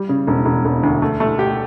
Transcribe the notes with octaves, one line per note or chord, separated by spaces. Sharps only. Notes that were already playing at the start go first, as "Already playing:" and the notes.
Already playing: G3
C#3
E1
E1
E1
D2
A3
A3
G4